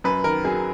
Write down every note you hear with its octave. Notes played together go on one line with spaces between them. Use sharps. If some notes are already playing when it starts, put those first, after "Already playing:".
F#2 B4
D#3 A#4
F#3 G#4